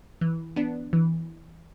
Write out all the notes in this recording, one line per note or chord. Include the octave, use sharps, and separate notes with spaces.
E3
B3 D4
E3